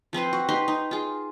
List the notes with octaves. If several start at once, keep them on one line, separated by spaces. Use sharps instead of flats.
F3 C4 B4 C5
F#4
D#4 G4 B4 C6
D#4
F4 G#4